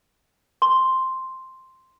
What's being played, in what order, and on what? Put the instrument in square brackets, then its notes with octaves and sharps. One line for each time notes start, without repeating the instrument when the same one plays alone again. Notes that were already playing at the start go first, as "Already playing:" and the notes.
[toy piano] C6